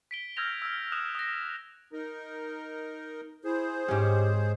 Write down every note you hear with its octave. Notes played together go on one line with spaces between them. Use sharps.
B6 D7 G7
E6 F6 G6 G#6 A#6 F7
E6 F6
D#6 F#6 E7 F7
D#6 A#6
D#4 A#4
E4 G#4 C5
G#2 C#4 G4